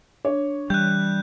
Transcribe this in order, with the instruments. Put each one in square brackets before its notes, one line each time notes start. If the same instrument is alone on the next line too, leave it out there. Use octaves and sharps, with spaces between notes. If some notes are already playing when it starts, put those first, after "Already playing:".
[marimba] D4 [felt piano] C#5
[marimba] E3 [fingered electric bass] G3 [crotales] F#6 G6